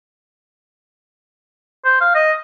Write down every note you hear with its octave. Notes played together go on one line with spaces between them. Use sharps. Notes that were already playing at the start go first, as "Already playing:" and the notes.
C5
F5
D#5